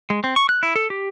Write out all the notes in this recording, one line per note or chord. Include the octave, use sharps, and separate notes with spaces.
G#3
C4
C#6
F#6
E4
A4
G4